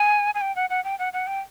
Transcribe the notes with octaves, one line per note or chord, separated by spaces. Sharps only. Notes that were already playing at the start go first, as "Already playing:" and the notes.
Already playing: G#5
G#5
G5
F#5
F#5
G5
F#5
F#5
G5